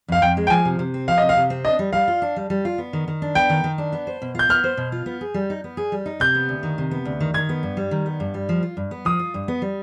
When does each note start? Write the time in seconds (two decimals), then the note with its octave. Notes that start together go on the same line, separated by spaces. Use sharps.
0.08 F2 F5
0.22 F2 G5
0.37 G#3
0.47 G5
0.50 F3 G#5
0.65 C3
0.79 C3
0.94 C4
1.08 F3 F5
1.18 C3 D#5
1.29 F5
1.36 C3
1.50 C4
1.65 D4 D#5
1.79 G3
1.93 G3 F5
2.08 F4
2.22 D4
2.36 G3
2.50 G3
2.65 F4
2.78 B3
2.93 D#3
3.08 D#3
3.22 D4
3.35 B3 G5
3.50 D#3
3.64 D#3
3.78 D4
3.92 B3
4.07 C5
4.22 B2
4.35 F4 G6
4.49 B3 F6
4.64 C5
4.77 B2
4.92 F4
5.06 B3
5.21 G#4
5.34 G3
5.50 D#4
5.64 B3
5.77 G#4
5.92 G3
6.06 D#4
6.20 C3 G6
6.35 B3
6.49 D2
6.63 D#3
6.78 C3
6.91 B3
7.05 D2
7.20 D#3
7.34 D#3 G#6
7.49 B3
7.63 G2
7.77 G3
7.91 D#3
8.06 B3
8.20 G2
8.34 G3
8.49 F3
8.63 F4
8.77 G2
8.91 B3
9.05 F3 D#6
9.19 F4
9.34 G2
9.48 B3
9.62 G3